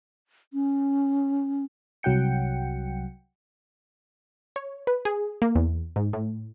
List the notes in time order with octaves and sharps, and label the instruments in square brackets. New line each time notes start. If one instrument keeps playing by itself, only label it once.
[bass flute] C#4
[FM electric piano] C2 F#3 F#5 G5 C#7
[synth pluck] C#5
B4
G#4
A#3
E2
G#2
A2